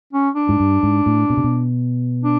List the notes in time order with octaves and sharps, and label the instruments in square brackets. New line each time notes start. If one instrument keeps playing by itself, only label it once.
[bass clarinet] C#4
D4
[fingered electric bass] G#2
G2
G#2
A2
B2
C3
B2
[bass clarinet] D4